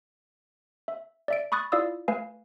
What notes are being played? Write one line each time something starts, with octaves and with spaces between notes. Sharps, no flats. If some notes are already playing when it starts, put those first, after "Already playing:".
E5
D5 E5 D7
B5 C#6 D#6 F#6 A6
E4 F4 D5 F5 D#6 E6
A3 B4 F5 G#5